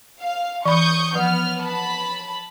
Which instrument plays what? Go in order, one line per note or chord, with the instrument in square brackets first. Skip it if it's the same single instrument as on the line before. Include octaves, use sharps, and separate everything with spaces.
[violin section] F5
[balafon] E3 B5 [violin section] C#6 D#6 G6
[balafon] F3 [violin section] B3 F6
[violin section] A5 B5